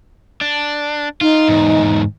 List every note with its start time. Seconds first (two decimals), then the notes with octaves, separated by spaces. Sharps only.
0.41 D4
1.21 D#4 F4
1.48 E2 G#2